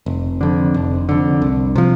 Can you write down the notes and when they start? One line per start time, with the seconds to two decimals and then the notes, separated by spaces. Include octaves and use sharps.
0.06 F1
0.41 F2 D3
0.74 F1
1.09 F2 D3
1.42 C2
1.76 C3 F3